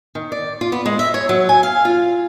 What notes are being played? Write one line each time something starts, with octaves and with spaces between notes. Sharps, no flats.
D#3
D5
F4
B3
G#3
E5
C#5
F#3
G#5
F5
F4